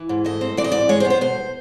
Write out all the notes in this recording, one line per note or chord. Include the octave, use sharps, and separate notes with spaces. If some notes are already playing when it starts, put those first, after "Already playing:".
Already playing: E3
G#2
A3 D#5
C4
E3 D5
D#5
G#2 D5
G#3 C#5
C5
B3
C5
B2 C5